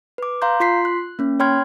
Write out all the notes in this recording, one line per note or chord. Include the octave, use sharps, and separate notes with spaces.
B4 D6
F5 A#5 C6 G6
F4 C6 B6 C7
F#6
A#3 C#4
C#5 G5 B5 C6 F6 G#6